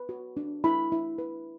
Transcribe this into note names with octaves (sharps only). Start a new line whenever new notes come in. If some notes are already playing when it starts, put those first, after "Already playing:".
Already playing: B4
F#4
D4
E4 B5
E4
B4